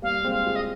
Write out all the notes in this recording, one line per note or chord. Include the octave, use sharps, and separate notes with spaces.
G3 A#3 F5
A#3
G#3 C4
F5
F4 G#4
D#5